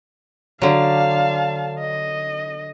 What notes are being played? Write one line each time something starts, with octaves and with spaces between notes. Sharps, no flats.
D3 F#3 F5 A5
D#5